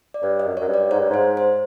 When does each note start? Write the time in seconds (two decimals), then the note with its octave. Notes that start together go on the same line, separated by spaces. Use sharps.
0.14 D5
0.23 G2 C#5
0.40 D#5
0.45 F#2
0.57 F#2 C#5
0.68 G2
0.74 D5
0.91 G#2 C#5
1.00 G2
1.10 G#2 C5
1.37 C5